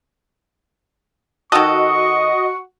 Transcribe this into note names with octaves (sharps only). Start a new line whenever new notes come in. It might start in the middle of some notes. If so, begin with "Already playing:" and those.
D#3 F#4 A4 D#5 C#6